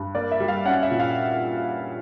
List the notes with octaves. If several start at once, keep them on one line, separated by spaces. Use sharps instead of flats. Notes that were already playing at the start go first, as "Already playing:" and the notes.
Already playing: G2
A#3 D5
E5
G3
F5
C#4 F#5
E5
A#2
F5